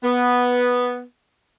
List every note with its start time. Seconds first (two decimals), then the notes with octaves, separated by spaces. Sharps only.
0.04 B3